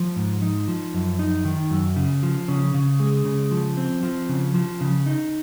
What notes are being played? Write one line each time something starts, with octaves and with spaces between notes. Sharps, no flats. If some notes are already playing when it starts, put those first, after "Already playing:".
Already playing: F3
G#2
D#4
F3
F#2
D#4
D#3
F#2
C#3
F3
C#3
C#3
G#3
C#3
F3
C4
F3
C#3
F3
C#3
D#4